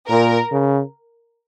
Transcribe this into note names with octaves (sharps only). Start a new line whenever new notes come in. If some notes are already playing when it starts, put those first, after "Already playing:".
A#2 A#4
C#3